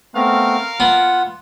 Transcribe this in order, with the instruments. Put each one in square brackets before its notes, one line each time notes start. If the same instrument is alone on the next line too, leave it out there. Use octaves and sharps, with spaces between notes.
[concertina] A3 B3 C4 [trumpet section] A#4 F5
[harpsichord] B3 [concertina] F4 F#5